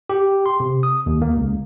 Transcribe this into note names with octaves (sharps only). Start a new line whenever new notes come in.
G4
C6
C3
D#6
D#2
A#3
C#2